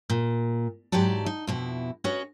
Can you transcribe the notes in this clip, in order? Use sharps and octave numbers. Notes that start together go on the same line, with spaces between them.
A#2
G#2 E3 F#3 G4 D5 A5
D#4
F2 B2 E4
C#4 F#4 B4 C#5 D#5